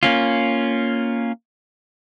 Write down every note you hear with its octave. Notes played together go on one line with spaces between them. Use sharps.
A#3 C#4 F4